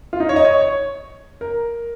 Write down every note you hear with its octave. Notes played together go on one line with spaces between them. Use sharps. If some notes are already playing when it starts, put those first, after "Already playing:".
F4
D#4
C#5
D#5
C#5
C#5
A#4